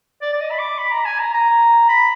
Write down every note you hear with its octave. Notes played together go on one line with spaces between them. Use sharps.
D5
D5
D#5
B5
D6
B5
A#5
G#5
A#5
A#5
B5